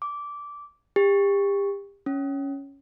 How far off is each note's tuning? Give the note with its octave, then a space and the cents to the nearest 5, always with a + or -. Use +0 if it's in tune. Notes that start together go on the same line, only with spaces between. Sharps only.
D6 -15
G4 +30
C#4 +0